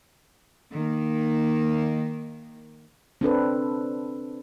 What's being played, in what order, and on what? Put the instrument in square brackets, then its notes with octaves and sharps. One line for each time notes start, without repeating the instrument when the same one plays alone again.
[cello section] D#3 A#3
[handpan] C4 D4 A4 B4